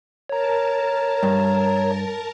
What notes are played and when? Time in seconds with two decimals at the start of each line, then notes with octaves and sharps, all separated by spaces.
0.29 A#4 C#5 A5 A#5
1.23 G2